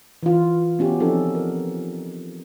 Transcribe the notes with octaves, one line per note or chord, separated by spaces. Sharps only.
E3 F4
B3 C#4 F#4 G4
F3 C4 C#4 D#4 A4
A#4